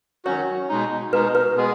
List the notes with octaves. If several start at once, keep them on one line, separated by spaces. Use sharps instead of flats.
D#3 F#3 C#4 F#4 C#5
B2 G#3 D#4
B2 G#3 D#4 B4
B4
B2 G#3 B3 G#4